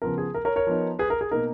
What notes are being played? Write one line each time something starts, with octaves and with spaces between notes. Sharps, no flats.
C#3 F3 B3 A#4
G#4
A#4
A#4 C#5
A#4 C#5
F3 B3 D#4
G#4 B4
A#4
G#4
B2 A#3 D#4 A#4